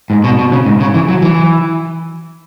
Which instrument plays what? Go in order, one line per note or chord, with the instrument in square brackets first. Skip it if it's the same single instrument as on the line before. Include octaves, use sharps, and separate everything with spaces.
[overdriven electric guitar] G#2
B2
B2
C#3
G#2
C#3
E3
F#3
E3